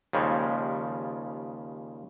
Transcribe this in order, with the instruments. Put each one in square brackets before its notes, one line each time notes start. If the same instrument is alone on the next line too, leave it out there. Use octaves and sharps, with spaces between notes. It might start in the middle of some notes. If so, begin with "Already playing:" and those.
[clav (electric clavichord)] D#2 C#3 F3 G3 G#3